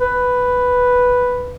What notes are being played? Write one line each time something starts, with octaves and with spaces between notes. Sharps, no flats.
B4